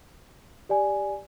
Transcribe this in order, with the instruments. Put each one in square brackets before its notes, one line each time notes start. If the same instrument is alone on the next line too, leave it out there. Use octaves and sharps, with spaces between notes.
[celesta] G4 D5 G#5